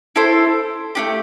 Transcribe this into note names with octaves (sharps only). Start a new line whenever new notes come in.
E4 A4 C5
A3 D4 G4